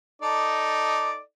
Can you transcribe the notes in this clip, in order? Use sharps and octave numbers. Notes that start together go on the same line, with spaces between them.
D#4 A4 D5